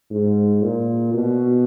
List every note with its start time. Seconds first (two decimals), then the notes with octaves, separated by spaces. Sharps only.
0.11 G#2
0.63 A#2
1.14 B2